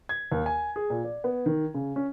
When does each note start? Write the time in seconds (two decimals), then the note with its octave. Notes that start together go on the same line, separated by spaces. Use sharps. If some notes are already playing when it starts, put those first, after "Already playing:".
0.09 G#6
0.32 D#2
0.46 G#5
0.76 G#4
0.90 A#2
1.05 D5
1.24 B3
1.46 D#3
1.74 C#3
1.96 C#4